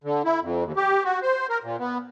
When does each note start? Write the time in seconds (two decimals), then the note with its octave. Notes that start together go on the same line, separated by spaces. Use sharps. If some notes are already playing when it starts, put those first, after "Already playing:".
0.04 D3
0.25 E4
0.42 F2
0.64 D#2
0.76 G4
1.04 F#4
1.22 C5
1.49 A#4
1.64 A#2
1.80 B3